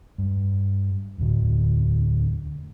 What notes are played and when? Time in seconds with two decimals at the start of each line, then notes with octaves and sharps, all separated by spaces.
0.18 G2
1.18 E1 D2 A2 D3